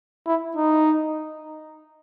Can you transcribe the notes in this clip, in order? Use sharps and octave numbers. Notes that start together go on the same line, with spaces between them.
E4
D#4